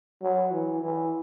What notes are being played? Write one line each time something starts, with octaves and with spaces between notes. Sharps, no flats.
F#3
E3
E3